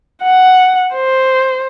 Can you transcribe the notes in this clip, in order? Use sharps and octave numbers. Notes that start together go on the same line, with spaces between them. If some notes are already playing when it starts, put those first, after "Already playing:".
F#5
C5